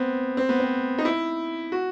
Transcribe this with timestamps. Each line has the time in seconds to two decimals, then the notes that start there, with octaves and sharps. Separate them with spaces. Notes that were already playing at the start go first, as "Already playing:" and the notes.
Already playing: B3 C4
0.37 C4
0.49 B3
0.60 C4
0.98 D#4
1.05 E4
1.72 F#4